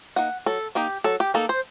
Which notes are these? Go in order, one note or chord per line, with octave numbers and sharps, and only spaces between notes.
A#3 D#4 F#5
F#3 A4
A#3 D#4 G4
F#3 A4
G4
A#3 D#4 A4
C5